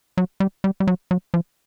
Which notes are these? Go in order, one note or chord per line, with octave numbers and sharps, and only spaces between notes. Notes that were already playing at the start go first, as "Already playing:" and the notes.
F#3
G3
G3
G3
F#3
F#3
F3